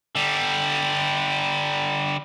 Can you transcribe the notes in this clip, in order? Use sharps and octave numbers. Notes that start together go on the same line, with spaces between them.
D3 G3